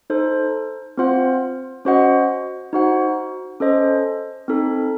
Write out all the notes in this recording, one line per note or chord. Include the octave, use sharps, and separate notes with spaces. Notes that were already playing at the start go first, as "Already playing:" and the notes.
D#4 A4 C5
C4 F4 C5 F#5
C#4 F#4 C5 D#5 F#5
D#4 F#4 C5 F#5
C#4 A4 C5 D#5
C4 D#4 A4